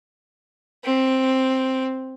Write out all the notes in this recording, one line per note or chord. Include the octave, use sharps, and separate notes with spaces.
C4